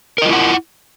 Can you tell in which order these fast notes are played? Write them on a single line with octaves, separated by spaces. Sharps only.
A#4 D#5 F4 E4 F#5